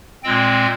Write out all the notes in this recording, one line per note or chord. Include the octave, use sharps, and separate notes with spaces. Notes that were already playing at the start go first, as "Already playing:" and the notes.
A#2 G#3 C4 G5